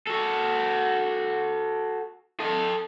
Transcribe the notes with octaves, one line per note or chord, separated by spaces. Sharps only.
F#4 A4
A4 D#5